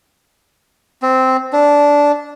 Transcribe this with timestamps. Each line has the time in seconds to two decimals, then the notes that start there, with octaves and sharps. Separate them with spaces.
1.02 C4
1.53 D4